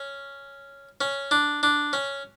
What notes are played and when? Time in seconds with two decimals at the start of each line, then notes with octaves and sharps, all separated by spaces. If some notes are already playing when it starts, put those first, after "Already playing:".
Already playing: C#4
1.01 C#4
1.31 D4
1.63 D4
1.93 C#4